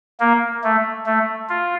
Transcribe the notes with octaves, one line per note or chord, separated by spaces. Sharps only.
A#3
A3
A3
F4